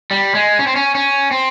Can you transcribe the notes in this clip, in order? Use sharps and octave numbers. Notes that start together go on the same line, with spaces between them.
G3
G#3
C#4
C4
C#4
C#4
C4